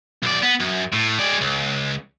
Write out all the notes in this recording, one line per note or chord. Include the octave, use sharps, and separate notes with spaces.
B1 D5
B3
F#2
A2
G#3 D5
C#2